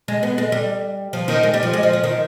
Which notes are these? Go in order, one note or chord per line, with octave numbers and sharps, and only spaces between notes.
G#3
B3
G#3
G3
F3
D#3
G#3
G3
F3
G#3
F3
F3
D#3